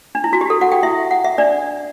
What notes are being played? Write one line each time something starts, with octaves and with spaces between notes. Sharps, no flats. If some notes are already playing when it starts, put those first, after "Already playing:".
D4
E4
F#4
G4
A4
F#4 F#5
G4 G5
E4 E5
F#5
E5
D4 D5